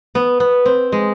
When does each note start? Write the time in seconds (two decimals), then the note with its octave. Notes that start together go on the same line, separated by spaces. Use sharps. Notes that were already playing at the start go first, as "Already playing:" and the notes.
0.15 B3
0.40 B3
0.66 C4
0.92 G#3